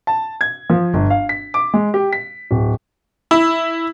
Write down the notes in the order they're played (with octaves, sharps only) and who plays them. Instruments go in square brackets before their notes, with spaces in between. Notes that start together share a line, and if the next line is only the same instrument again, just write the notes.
[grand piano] A5
G#6
F3
G1
F5
B6
D6
G#3
G4
B6
D1
[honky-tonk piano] E4